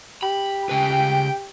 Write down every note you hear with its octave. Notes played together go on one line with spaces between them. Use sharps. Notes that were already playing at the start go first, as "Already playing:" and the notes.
G4 B5
C#3 B4 G5